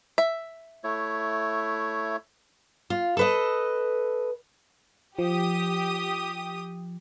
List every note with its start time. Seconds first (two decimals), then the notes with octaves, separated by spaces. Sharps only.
0.18 E5
0.84 A3 E4 C#5
2.90 F4
3.17 A4 B4 D#5
5.19 F3 G4 D#6